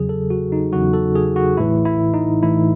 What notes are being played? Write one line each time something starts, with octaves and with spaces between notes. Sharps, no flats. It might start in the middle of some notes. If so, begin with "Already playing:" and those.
Already playing: E2 C#3 F#3 G#4
A4
F#4
D#4
E2 C#3 F#3 F#4
A4
G#4
F#4
A1 A2 E3 E4
E4
D#4
A1 A2 E3 E4